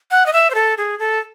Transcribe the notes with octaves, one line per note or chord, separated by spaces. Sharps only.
F#5
D#5
E5
C5
A4
G#4
A4